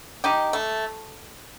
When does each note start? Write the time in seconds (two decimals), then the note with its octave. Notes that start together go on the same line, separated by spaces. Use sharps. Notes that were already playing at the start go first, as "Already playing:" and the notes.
0.24 D#4 G4
0.53 A3